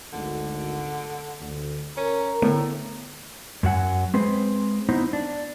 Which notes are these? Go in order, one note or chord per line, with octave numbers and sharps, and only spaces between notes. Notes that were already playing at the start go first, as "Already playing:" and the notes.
G#1 D2 D3
D2
C#4 A#4 A#5
A2 D3 A3 B3
F#2 F#3 F#5 G#5
G#3 C4 G#4 B4 C5
B3 D#4 E4 C5
D4